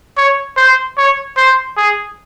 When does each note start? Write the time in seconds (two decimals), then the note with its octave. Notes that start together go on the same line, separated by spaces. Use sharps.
0.17 C#5
0.57 C5
0.97 C#5
1.37 C5
1.77 G#4